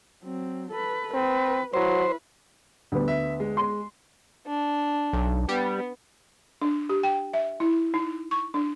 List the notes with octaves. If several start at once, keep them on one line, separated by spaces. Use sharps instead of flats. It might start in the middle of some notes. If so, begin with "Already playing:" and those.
F#3 C4
A4 B4
C4 B4
F#3 E4 B4 C5
D2 G3 B3
E5
G#3
C6
D4
B1
G3 B3
D4
G4
G5
E5
E4
D#4
C#6
D4